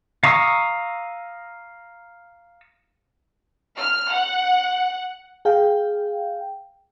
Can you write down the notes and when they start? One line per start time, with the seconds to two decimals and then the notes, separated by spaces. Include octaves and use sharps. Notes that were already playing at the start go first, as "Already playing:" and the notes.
0.23 F5 A#5 C#6 D#6 E6
3.77 F6
4.13 F#5
5.45 G#4 F5 G5